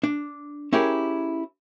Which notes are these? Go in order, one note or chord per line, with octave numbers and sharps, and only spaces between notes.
D4
C#4 E4 G4 G#4 A#4